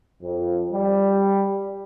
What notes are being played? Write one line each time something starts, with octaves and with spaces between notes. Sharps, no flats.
F2
G3